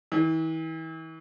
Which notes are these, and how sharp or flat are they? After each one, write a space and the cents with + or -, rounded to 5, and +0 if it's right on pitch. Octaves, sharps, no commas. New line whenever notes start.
E3 -40